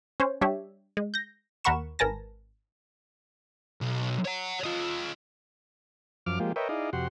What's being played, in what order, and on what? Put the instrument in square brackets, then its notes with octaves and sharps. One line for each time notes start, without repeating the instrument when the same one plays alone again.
[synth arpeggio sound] C#4 C5 C#5
G3 D4 G4 C#5 E5
G#3
G6 A#6
D#2 A#4 F#5 B5 C#6 E7
G#1 A#4 B4 G#5 A5 A#6
[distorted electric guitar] B1
C#5 F#5
F4 D#5
[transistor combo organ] F#2 F3 D6 F6
F3 G#3 A#3 F4 G4
A#4 B4 C#5 D#5 E5 G5
D#4 E4 G#4 D5 D#5 F5
F2 C3 F#4 G4 F#5 C6